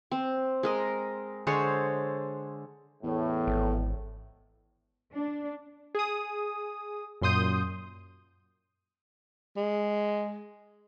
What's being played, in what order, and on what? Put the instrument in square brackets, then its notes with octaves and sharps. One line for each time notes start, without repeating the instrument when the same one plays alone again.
[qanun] C4
G#3 A#4 D#5
D3 G#3 C5 C#5
[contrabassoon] E2 [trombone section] A2
[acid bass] G#1
[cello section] D4
[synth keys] G#4 D#6
F#2 A#2 C6 D#6 G6 D#7
[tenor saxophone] G#3